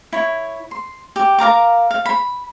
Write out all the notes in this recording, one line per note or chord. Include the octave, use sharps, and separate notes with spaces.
E4 C#5
C6
G4
A#4 F5 A#5 D6
F5
B5